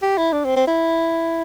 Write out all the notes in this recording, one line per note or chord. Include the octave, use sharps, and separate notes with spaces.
G4
E4
D4
C4
C4
E4